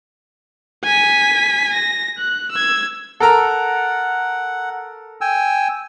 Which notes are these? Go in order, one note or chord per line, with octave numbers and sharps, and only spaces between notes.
G#5 B6
A#6
F#6
E6 G#6
A4 A#4 F#5 A#5
G5 G#5 E6